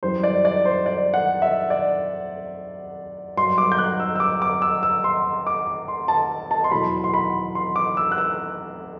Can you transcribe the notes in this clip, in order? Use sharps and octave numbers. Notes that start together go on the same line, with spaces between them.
F#2 E3 G3 C5
D5
D5
C5
D5
F#5
E5
D5
G2 F#3 C6
D6
G6
F#6
E6
E6
D6
D6
E6
E6
C6
D6
C6
A5
A5
C6
E2 B2 F#3 B5
C6
B5
C6
D6
E6
F#6
E6